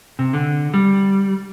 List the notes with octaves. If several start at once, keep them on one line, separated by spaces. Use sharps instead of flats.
C3
D3
G3